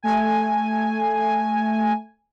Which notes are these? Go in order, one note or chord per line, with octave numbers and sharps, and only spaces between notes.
A3 G#5